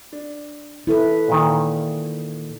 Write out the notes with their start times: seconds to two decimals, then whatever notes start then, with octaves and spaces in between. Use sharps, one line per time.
0.13 D4
0.87 E4 A4 B4
1.28 A#2 D#3